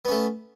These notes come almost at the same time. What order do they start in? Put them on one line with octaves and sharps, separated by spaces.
B3 C#4 A3